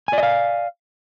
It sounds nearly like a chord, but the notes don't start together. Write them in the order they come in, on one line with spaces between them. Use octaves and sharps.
G#5 D5 D#5 F5